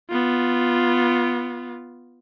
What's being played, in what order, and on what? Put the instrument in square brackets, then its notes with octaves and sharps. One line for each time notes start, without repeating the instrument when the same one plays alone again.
[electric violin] B3 F4